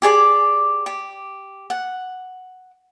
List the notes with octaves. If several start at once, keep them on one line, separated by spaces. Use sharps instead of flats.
G4 G#4 D5 D6
G4
F#5